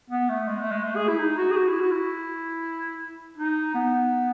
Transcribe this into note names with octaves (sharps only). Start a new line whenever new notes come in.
B3
A3
G#3
A3
G#3
A3
G#4
E4
D#4
F#4
G#4
F#4
E4
F#4
E4
D#4
B3